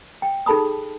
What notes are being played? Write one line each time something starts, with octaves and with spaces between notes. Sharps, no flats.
G5
D#4 G#4 A4 A5 B5 D#6